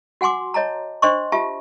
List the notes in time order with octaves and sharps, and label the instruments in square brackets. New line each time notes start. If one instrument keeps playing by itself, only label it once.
[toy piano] F#4 F#5 G#5 C6 D6
C#5 D#5 A5 A#5
D4 C5 D#5 C6 C#6
F4 G4 E5 A5